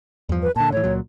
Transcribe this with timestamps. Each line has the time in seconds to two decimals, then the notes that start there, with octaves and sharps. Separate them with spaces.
0.29 E2 G2 F3
0.43 B4
0.56 A#2 D3 A5
0.72 A2 E3 C#5
0.84 C#2 A#2 F#3